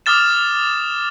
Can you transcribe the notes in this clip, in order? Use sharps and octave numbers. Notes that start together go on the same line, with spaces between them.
D6 D#6 F6 A6 E7